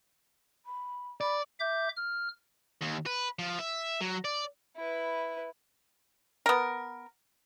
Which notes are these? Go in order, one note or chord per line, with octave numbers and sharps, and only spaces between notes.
B5
D5 B5
E5 D6 G6
F6
D#2
B4
F3
E5
F#3
D5
E4 B4
B3 A#4